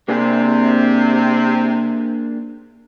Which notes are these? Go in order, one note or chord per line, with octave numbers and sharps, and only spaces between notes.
C3 A#3 D4 G#4